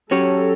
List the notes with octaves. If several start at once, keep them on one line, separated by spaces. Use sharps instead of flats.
F#3 C#4 G4 A4 C#5